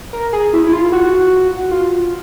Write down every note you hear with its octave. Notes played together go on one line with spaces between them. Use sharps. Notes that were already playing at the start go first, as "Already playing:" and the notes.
A#4
G#4
E4
E4
F4
F#4
F4